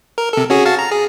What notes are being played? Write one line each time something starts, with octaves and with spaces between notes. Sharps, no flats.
A#4
C3 A4
C#4 F#4 G#4
F#4 F5 A5
A#5
G#4